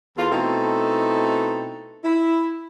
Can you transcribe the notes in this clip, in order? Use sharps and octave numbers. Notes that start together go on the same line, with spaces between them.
E2 F4 A4
B2 A3 C4 D#4 E4 A4
E4